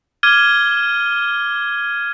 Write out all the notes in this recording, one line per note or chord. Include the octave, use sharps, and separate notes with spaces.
D6 F6 G#6 D#7 G7